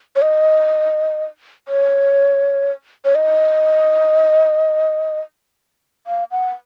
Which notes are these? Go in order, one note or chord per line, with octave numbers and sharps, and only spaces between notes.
C#5
D#5
C#5
C#5
D#5
F5
F#5